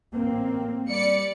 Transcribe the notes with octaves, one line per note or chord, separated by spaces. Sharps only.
A1 A#3 C4
G3 D5 C#7